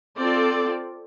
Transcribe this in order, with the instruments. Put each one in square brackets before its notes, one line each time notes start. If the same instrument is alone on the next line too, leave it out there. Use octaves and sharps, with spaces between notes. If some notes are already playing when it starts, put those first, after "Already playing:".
[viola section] C4 F4 A4 D5